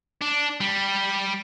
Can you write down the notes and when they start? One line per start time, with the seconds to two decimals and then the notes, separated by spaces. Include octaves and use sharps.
0.22 D4
0.61 G3